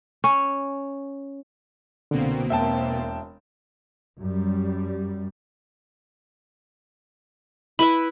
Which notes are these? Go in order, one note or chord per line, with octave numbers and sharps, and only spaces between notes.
C#4
C2 B2 D3 A#3 C4
E1 E5 G5 A5
F#2 G3
E4 B4 E5 B5